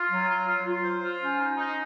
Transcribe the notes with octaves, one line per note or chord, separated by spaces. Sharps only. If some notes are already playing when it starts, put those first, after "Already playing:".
Already playing: F4
F#3
F4
F4
F4
C5
F4
C#4
D#4
D#4